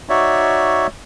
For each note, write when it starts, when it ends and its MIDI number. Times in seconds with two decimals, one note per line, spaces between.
0.09 0.87 63
0.09 0.87 66
0.09 0.87 73
0.09 0.87 74
0.09 0.87 76